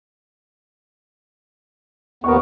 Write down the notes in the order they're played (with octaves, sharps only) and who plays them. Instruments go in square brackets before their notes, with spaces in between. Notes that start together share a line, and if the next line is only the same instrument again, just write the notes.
[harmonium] D#2 B3 [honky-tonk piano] A#4 F#5 C#6